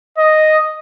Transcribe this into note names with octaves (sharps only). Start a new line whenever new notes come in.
D#5